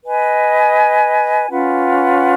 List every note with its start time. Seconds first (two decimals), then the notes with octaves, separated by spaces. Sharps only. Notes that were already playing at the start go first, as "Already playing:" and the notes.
0.04 B4 D#5 G#5
1.48 C#4 F4 B4 F#5